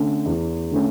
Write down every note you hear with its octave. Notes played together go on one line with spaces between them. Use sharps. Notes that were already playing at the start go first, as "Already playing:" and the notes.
Already playing: D3 A3 C#4
E2
D3 A3 C#4